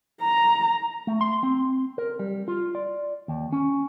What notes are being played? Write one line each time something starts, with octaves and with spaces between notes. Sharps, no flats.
A#5
A3
C6
C4
A#4
G3
F4
D5
D#2
C#4